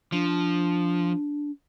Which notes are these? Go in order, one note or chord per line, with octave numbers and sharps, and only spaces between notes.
F3 D4